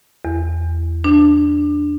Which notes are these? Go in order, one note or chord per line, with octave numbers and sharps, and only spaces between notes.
E2
D4